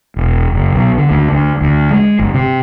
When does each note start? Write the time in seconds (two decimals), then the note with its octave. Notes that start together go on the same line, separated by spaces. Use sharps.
0.16 E1
0.53 F#1
0.72 B1
0.98 D3
1.11 D2
1.32 D2
1.61 D2
1.91 G#3
2.19 G1
2.34 C3